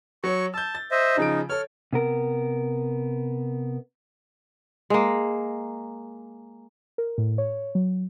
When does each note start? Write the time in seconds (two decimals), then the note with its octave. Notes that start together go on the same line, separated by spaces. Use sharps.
0.24 F#3 C#5 C#6
0.54 A5 E6 G6
0.75 A6
0.91 C5 D#5 E5
1.17 C#3 F3 D#4 D7
1.49 A4 C#5 F6
1.93 C3 B3 A#4
4.90 G#3 A#3
6.98 A#4
7.18 A2
7.38 C#5
7.75 F#3